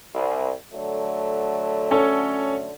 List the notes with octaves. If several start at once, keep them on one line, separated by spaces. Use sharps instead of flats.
C2
D3 F#3 A3
C#4 A4 C#5